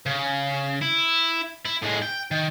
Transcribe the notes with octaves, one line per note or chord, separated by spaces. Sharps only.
C#3
E4
E4
A2 G#3
G5
D#3